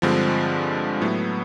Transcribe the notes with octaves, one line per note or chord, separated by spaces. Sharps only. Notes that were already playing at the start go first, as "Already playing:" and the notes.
G2 D3 F3 G#3 C4
A2 F#3 B3 E4